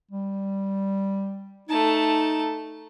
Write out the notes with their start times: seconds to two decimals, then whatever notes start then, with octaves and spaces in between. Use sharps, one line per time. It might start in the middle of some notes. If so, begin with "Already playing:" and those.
0.11 G3
1.69 A3 D#4 A5